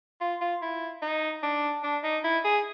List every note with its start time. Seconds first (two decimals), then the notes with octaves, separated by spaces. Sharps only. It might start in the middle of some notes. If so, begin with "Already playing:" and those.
0.21 F4
0.41 F4
0.62 E4
1.02 D#4
1.43 D4
1.83 D4
2.03 D#4
2.24 E4
2.44 G#4